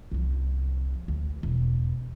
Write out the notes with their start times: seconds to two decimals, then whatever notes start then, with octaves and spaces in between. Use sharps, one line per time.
0.12 C2 F3
1.08 D2
1.43 E1